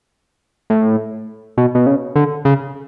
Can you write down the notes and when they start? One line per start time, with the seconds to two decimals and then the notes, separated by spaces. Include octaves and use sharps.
0.70 A2
1.57 B2
1.75 B2
1.86 C#3
2.16 D3
2.45 C#3